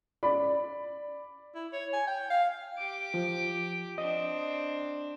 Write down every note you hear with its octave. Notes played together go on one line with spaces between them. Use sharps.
D5 B5
E4
C#5
G#5
G5
F5
G4 D6
F3
C4 D4 D#5